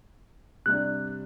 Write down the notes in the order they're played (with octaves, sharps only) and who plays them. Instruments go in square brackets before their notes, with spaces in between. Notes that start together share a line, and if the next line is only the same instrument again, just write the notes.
[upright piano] C3 G3 D4 [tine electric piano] F#6